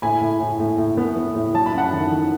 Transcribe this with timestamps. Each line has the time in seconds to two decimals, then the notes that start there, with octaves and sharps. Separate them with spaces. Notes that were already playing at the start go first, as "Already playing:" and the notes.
0.02 A2 G#5 B5
0.21 A2
0.40 A2
0.59 A2
0.78 A2
0.97 B3
1.16 B3
1.35 A2
1.54 F#3 A5
1.66 B5
1.73 F#2 F#5 A5
1.92 D#3
2.11 D#3